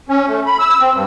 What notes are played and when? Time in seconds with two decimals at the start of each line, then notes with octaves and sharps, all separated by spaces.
0.09 C#4
0.27 A3
0.46 B5
0.59 E6
0.80 C4
0.94 G2